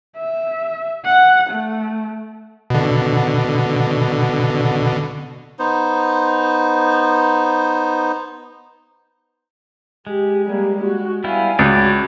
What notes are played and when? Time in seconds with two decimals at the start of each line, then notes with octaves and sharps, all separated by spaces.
0.17 E5
1.05 F#5
1.50 A3
2.70 B2 D3
5.59 B3 D#4 C5
10.07 G#3 G4
10.46 G3 A#3
10.84 F#4
11.24 G3 B3 E4 F5 G#5
11.59 C#2 F#4 C#5 D5